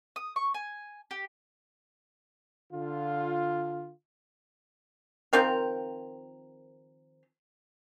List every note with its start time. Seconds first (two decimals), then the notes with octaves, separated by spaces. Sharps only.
0.16 D#6
0.36 C#6
0.54 G#5
1.11 G4
2.72 D3 F4
5.33 D#3 F3 C4 A#4